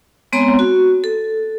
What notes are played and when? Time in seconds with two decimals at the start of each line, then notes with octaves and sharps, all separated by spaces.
0.32 G#3 B3 C4 C#5 A#5 C6
0.59 F#4
1.04 A4